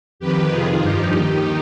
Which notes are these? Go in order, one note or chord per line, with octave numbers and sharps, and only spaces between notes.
F2 D#3 G4 B4
F2 C3 D#3 F4 G#4
G2 F3 D#4 G4
D#2 D#3